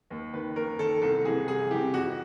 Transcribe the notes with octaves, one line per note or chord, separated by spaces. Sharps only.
D#2
D#3 B4
D#2 A#4
D#3 A4
C2 A4
C3 E3 G#4
C2 G#4
C3 E3 G4
F2 F#4